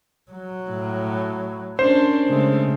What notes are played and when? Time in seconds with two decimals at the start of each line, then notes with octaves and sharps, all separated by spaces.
0.31 F#3
0.71 A2
1.79 C#4 D4 A#4 C5
2.29 C#3 G#3 A3 C4